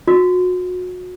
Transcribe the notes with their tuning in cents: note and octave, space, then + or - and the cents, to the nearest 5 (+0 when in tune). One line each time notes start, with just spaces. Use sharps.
F#4 -30